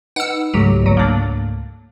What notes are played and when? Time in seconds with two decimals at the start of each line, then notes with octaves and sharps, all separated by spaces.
0.16 D#4 B4 F#5 E6
0.54 C#2 G#2 F#3 A3 G4
0.83 G1 F#3
0.97 A#3 D4